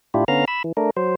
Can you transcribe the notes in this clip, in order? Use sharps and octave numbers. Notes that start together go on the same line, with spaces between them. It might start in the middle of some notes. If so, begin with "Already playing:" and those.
A2 D4 E4 F4 G4
D3 B3 C#4 F5 A#5 F6
B5 E6
E3
A3 D4 A#4
F#3 C5